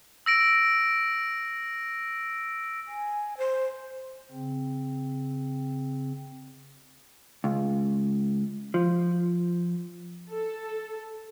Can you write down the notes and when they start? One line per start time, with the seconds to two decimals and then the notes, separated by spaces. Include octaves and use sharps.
0.26 E6 A#6 D7
2.86 G#5
3.38 C5
4.32 C#3 C4
7.44 C#2
8.74 F3
10.30 A4